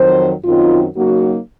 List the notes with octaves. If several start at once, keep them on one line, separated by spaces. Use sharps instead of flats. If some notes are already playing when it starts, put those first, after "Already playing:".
Already playing: F2 D#3 F#3 C5
F#2 D#3 F#3 C4 D#4 F4
C#3 F#3 A#3 D#4 F#4